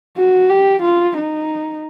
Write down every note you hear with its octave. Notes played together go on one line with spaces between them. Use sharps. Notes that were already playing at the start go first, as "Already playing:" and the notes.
F#4
G4
F4
D#4